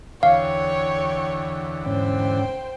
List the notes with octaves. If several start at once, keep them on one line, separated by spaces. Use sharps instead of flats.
E2 D3 E3 C#5 F5 G5
G#2 C#4 C5 G5